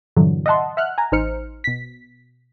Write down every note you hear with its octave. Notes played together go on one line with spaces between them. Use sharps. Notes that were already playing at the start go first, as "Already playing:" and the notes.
G2 A#2 D3 E3 F#3
D#5 E5 F#5 A5 C6
E5 F#5 F6 F#6
G#5 A#5
A1 D#4 C5 F6 C#7
B2 B6